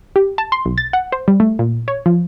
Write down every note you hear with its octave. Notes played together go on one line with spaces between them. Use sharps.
G4
A5
C6
B1
A6
F#5
C5
G3
A3
A#2
C#5
F3